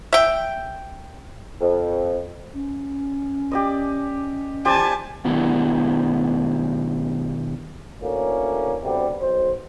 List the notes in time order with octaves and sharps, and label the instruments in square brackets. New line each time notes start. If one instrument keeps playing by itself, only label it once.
[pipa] E5 G5
[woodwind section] F2
[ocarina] C#4
[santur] G4 D5 D#5
[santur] G4 C5 D5 [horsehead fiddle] G#5 A5
[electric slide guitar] B2 D#3 B3 D4 E4 G4
[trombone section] D2 A2 A#3 C#4
D2 C3 G3 B3
B1 C5